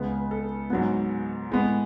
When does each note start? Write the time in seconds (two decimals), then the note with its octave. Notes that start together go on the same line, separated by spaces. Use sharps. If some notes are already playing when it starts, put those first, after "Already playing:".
Already playing: C#2 C#3 G#3 B3 B4
0.31 A4
0.70 G#2 F#3 B3
1.49 A2 G#3 B3